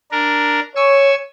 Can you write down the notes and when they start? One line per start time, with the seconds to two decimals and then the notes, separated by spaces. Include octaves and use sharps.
0.11 D4 A#4
0.76 C#5 G#5 C#6 E6